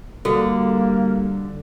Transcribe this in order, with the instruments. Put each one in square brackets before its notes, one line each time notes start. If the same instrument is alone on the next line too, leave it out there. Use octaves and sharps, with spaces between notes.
[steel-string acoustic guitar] D3 [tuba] G3 [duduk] A#3 [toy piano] F#4 A4